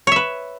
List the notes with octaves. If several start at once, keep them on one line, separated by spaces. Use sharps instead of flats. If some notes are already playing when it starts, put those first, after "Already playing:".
B4 C#5 E5